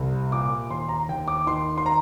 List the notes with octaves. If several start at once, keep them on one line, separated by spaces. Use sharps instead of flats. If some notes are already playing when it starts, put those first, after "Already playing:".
Already playing: C2
A#2 D6
D#2 C6
A#5
D#2 G5
D6
D#3 C6
C6
A#5